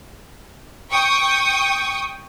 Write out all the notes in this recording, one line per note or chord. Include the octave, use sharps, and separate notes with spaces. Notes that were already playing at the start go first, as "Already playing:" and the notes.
G5 C#6 D#6